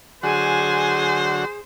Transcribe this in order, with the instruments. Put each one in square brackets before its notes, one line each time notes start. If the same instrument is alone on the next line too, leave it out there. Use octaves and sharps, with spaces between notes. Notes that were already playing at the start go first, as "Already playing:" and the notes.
[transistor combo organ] D3 F#3 F#4 [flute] G#4 [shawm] C5 [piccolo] G#5